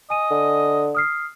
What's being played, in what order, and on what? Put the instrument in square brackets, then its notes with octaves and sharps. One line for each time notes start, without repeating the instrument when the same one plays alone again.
[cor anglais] D#5 [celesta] G#5 D#7
[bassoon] D3
[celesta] D#6 F6 C7